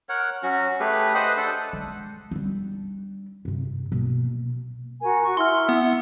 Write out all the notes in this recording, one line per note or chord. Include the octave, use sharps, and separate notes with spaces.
A#4 C#5 F#5
F#3 C#4 F#4
A3 G4 G#4 B4
B4 C5 D#5 F#5
D4 A4
G#3
G3 D4
G2 C3
B2 A#3
F#4 A#4 G#5
F#4 C#6
E4 C6 F6
B3